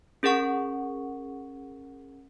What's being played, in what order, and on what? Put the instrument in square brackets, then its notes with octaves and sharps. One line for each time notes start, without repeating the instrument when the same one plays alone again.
[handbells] C#4 G#4 A#4 F#5 C#6